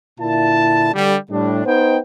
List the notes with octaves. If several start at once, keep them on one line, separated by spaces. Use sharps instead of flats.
A#2 D3 E4 A5
D3 G3
A2 G3 D4
B3 D#4 C5 G5